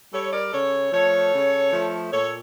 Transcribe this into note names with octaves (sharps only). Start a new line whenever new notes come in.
G3 A4 C#5
A#4 D5
C#3 A4 C#5
F3 A3 A4 C#5
C#3
F3 A3
A#2 A4 C#5